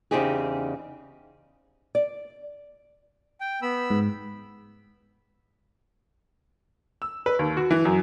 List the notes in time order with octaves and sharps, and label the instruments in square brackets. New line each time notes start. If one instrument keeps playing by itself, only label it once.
[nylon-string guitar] E2 C#3 C4 D#4 G4 G#4
D5
[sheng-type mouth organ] G5
B3 B5 E6
[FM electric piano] G#2
[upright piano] E6
B4
D#2
F#4
E3
F#2